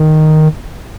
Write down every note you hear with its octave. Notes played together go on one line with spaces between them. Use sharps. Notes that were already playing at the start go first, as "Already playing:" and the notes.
Already playing: D#3